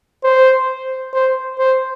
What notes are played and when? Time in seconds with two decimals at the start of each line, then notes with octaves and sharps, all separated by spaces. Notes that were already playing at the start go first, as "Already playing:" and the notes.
0.24 C5
1.14 C5
1.59 C5